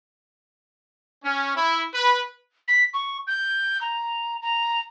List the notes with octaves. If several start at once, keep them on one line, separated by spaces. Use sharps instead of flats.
C#4
E4
B4
B6
C#6
G6
A#5
A#5